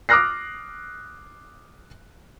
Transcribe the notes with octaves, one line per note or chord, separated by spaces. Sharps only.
D6 D#6 F6 F#6 A#6 C7